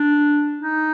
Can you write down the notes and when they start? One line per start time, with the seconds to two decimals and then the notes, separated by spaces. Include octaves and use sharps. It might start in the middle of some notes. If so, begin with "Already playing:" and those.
Already playing: D4
0.60 D#4